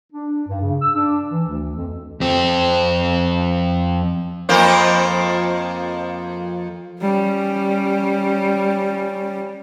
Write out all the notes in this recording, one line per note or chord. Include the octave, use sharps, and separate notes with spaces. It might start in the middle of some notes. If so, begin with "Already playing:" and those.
D4
G2
C#3
E6
D4
E3
D2
F2
F2 C4
F2 A#3 C5
G3 C#4